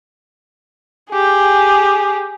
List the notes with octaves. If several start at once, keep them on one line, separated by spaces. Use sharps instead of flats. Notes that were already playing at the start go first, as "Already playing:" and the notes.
G4 G#4